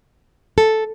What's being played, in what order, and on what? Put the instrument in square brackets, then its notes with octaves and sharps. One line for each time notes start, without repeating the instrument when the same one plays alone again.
[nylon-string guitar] A4